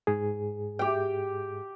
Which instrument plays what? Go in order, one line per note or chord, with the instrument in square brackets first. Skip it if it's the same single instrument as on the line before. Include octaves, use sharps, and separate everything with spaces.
[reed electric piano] G#2 G#4
[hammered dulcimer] G4 G5